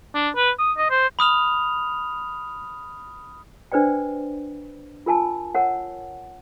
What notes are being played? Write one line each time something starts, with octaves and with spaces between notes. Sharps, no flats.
D4
B4
D#6
D#5
C5
B5 D#6 F6 F7
D4 B4 C5 D5 G5
F4 A#4 G#5 A5
A#4 C#5 F#5